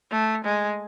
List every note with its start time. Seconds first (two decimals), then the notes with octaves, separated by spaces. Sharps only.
0.11 A3
0.44 G#3